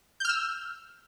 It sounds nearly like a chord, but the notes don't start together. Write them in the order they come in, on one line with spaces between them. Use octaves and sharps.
G6 F6 E6